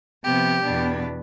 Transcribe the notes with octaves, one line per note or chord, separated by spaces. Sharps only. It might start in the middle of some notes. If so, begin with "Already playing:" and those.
C3 F3 B3 G4
E2 B2 B3 D4